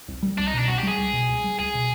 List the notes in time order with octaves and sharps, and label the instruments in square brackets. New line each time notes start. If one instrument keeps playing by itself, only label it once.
[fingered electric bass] C2
G3
[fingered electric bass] C2 [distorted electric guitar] D4
[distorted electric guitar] D#4
[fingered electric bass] B2 [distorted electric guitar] D4
[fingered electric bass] C2 [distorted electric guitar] F#4
[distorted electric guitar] G4
[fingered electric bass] G3
[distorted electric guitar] G#4
[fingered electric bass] C#2
B2
C#2
G3
[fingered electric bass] C#2 [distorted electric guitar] G#4
[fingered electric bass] B2